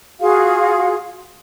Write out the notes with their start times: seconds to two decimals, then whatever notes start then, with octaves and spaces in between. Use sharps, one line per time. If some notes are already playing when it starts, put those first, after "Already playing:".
0.20 F4 F#4 G#4 F5